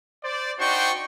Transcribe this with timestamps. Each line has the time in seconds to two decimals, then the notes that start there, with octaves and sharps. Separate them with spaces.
0.24 C5 D5
0.59 D4 D#4 F#4 C5 G5 C#6